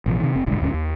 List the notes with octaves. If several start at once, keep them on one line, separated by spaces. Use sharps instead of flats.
A1 B2 F3
C3 D#3
F1 C4
G1 C2 G#2 D3
D#1 D2 G#2 C#4
D#2